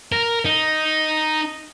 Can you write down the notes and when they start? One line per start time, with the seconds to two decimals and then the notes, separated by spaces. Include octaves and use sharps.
0.12 A#4
0.45 D#4